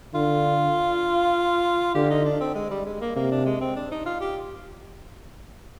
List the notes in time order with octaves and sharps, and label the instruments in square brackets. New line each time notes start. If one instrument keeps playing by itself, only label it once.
[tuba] D3 [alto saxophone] F4
[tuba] D3 [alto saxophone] G4
[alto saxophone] D#4
D4
C4
G#3
G3
G#3
A#3
[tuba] C3 [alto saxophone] A#3
[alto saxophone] D4
G#3
C4
D4
D#4
F4
G4